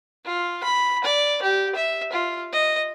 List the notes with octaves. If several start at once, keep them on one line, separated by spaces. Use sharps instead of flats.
F4
B5
D5
G4
E5
F4
D#5